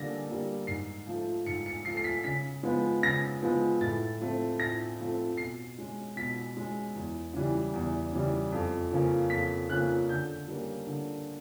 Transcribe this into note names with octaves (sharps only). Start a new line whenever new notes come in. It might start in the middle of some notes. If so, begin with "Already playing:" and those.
Already playing: D3 G3 A#3 A#6
G3 A#3
G#2 C7
F3 A3
G#2 C#7
C#7
F3 A3 C7
C7
B6
C#3 B6
F3 G#3 B3
C#3 A#6
F3 G#3 B3
A2 A6
F3 A3 C4
A2 A#6
F3 A3 C4
B2 C7
G#3 C#4
B2 B6
G#3 C#4
E2
C#3 E3 G3
E2
C#3 E3 G3
F2
C#3 F3 A#3 C#4
F2 B6
C#3 F3 A#3 C#4 F#6
D3 G6
G3 A#3 C#4
D3